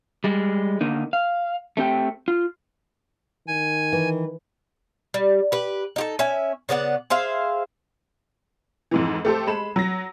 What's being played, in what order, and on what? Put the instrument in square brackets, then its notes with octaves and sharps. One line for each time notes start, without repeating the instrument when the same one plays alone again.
[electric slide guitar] G3 G#3
D3 A#3 D#4
F5
A3 C4 G4 G5
F4
[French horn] D#3 [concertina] G#5
[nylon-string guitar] E3
[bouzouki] G3
G4 B4
D#4 G4 A4
C#4 E5 G#5
C#3 B3 D5 F#5
G#4 C5 E5 F5
[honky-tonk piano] F2 G#2 E3
A3 G4 A4 C5
G#3 B5 E7
F#3 A#6